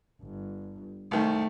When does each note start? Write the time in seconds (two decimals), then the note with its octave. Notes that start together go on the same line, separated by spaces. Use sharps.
0.22 G1
1.11 C2 D#3 A3